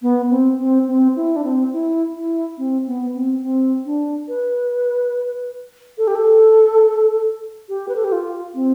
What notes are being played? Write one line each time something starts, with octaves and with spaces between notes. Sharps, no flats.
B3
C4
C4
C4
E4
D4
C4
E4
E4
C4
B3
C4
C4
D4
B4
A4
G4
A4
G4
B4
A4
G4
F4
C4